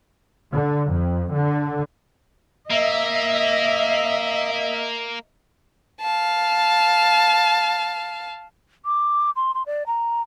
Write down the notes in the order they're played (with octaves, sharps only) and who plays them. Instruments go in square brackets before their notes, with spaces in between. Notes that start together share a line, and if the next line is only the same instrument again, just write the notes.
[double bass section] D3
F2
D3
[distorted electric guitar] A#3 [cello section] D#5 E5
[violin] F5 A5
[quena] D6
C6
C6
D5
A#5